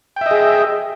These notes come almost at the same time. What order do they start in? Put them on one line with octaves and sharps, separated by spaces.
G5 E5 D#5 G#4